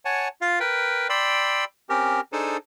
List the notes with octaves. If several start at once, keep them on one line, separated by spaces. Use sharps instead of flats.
C#5 F#5 G#5 A5
F4 F5
A#4 B4 G5
D5 G5 B5 C6 E6
C4 C#4 G4 A#4
D4 D#4 G#4 A4 C5